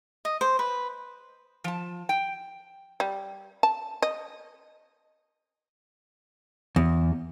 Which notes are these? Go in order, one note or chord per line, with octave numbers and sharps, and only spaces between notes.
D#5
C5
B4
F3 A5
G5
G3
A5
D#5
E2